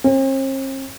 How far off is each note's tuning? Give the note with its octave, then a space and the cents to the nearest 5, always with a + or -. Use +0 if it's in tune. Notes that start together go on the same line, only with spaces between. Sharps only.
C4 +45